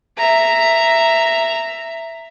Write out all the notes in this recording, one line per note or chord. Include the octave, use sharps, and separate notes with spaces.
E5 A#5